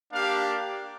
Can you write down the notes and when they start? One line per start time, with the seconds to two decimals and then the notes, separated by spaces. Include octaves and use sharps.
0.12 A#3 D4 G4 F5